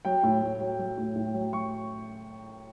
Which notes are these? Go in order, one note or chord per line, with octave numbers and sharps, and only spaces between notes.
F#3 G5
A2
A2
F#3
F#3
A2
A2
F#3
F#3 C#6